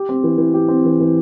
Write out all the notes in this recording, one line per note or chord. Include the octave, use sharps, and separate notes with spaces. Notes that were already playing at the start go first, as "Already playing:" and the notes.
Already playing: G4
C4
E3
E3
G4
C4
E3
E3